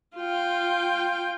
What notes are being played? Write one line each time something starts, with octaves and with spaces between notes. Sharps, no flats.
F4 G5